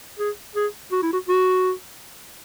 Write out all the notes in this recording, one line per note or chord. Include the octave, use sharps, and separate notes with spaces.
G#4
G#4
F#4
E4
F#4
F#4